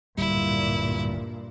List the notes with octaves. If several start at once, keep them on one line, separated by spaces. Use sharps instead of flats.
D1 G2 A#2 G3 E4